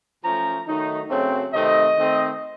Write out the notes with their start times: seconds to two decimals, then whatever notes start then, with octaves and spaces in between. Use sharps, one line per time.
0.23 F#2 F3 A3 C#4 A#5
0.67 D#3 F#3 A3 D#4
1.09 F#2 C#3 F#3 A3 C4
1.52 C3 D#3 A3 C4 D#5
1.96 D#3 A3 C4